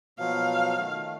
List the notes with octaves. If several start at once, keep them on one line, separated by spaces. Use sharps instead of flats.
B2 F3 F#3 F5
D#3 A3